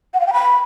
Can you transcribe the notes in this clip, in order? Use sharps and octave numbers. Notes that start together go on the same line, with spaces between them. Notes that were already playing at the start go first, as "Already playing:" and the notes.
F#5
F5
G5
B5